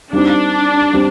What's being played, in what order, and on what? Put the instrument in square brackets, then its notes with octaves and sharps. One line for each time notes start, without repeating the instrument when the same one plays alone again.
[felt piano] G3 C4 D#4 [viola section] D4
[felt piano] G3 C4